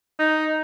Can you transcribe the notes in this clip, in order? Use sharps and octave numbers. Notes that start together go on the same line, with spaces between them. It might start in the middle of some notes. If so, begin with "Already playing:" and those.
D#4